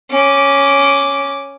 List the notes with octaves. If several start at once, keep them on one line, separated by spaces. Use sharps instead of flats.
C#4 D6